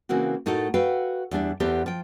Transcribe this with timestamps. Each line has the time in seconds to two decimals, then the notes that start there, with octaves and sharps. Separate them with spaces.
0.09 C#3 E3 A#3 C4 F#4
0.46 A2 A3 D#4 F#4 A4 A#4
0.74 F#4 A4 B4 F5 G5
1.31 E2 G3 D4 E5
1.60 E2 B3 G4 A4 C5
1.86 F3 G5